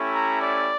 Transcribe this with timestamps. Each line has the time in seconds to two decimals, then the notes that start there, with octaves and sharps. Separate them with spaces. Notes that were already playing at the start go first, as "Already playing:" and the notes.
Already playing: A3 C#4 E4 G4
0.13 A#5
0.41 D5